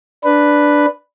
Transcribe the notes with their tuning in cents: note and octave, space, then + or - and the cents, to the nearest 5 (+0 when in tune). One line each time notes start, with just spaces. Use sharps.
D4 +0 B4 +0